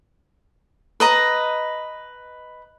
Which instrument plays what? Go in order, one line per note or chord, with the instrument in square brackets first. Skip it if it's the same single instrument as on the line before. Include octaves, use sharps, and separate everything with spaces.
[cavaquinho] B4 D#5 A#5